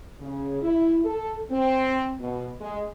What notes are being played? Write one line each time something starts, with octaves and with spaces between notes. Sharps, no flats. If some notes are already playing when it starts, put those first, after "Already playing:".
C#3
E4
A4
C4
B2
G#3